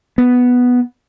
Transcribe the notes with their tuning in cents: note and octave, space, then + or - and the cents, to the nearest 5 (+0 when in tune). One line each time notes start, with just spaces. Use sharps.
B3 +0